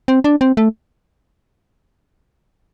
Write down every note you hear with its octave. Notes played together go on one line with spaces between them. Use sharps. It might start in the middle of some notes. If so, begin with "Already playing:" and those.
C4
D4
C4
A3